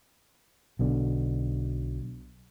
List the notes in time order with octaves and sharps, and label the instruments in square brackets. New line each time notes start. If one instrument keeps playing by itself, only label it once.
[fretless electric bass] B1 B2 D3